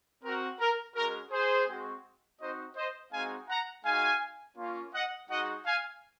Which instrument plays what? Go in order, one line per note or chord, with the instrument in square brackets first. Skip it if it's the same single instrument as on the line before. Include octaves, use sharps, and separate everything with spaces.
[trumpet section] C4 F#4 A#4
A#4
G#3 C#4 F#4 A#4
G#4 C5
G#3 C4 F#4
C4 D#4 F#4 C5 D#5
C5 D#5
G#3 C4 D#4 F#4 F5 G#5
F#5 A#5
G#3 D#4 F#4 F5 G#5
A#3 C#4 F4
D#5 F#5
G#3 D#4 F#4 D#5 F#5
F5 G#5